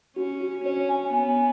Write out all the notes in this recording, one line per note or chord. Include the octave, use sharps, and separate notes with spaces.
C#4 F#4
F#4
C#4 C#5
G#5
B3 G#5